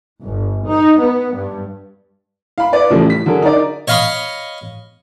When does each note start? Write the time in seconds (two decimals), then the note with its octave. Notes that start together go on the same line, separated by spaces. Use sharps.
0.23 G1
0.66 D#4
0.99 B3
1.34 G2
2.58 F5 B5
2.73 B4 D5
2.90 A2 C#3 E3 F3 G3 A3
3.10 B6
3.26 D3 F#3 G#4 A#4
3.42 D#4 A#4 D5
3.88 C#5 D#5 F5 B5 C#6 D#6